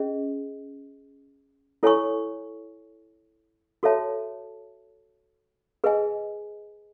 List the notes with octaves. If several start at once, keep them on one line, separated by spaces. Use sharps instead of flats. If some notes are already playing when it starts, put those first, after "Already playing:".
Already playing: C#4 G#4 D#5
E4 A4 C#5 G#5 C#6
F#4 A4 C#5 E5 A5
G#4 B4 D#5 G#5